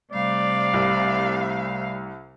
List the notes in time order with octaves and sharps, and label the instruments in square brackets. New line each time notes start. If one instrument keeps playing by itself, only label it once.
[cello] C3 F5 [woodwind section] G3 A3 [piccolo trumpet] D5
[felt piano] C2